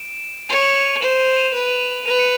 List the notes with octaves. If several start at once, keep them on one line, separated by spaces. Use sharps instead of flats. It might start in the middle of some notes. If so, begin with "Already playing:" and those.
Already playing: D7 E7
C#5 D#7 F7
E7 F#7
E7 F#7
D#7 F7
C5 E7 F#7
D#7 F7
D#7 F7
B4
B4 D#7 F7
C#7 D#7